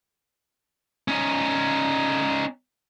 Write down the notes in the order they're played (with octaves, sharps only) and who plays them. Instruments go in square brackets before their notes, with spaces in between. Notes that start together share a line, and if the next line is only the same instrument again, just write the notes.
[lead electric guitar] C#4 D#4